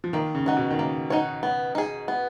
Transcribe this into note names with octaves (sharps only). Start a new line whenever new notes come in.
F3
D#3 A#3
C#3
D#4 F#4 C#5
B2
D#3
C#3 A#3
D#4 F#4 C#5
B3
D#4 G#4
B3